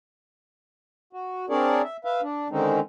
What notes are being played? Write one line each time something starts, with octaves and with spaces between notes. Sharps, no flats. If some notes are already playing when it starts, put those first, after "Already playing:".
F#4
C4 D4 G#4 A#4 C#5 D5
E5
B4 E5 F5
D4
D3 D#3 G#3 C4 C#4 D#4